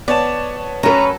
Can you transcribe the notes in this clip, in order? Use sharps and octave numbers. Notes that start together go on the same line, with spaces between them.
B3 C#5 D5 A5
F#3 C#4 A4 B4 A#5